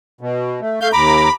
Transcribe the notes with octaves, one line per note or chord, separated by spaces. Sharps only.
B2
A3
A3 F5 G6
D#2 A#5 B5 D6